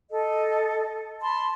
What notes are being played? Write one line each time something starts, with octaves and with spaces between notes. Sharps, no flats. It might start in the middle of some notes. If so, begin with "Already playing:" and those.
A4 D#5
A5 B5 C6